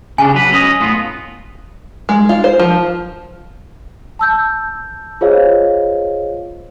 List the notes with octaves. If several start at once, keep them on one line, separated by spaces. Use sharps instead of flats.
C#3 D4 G#5
F#3 B4
C#4 D#5
A2 B3 F4
G#3
F4
C5
F3
A5 E6 G6
F4 G#4 C5 C#5 D#5 F5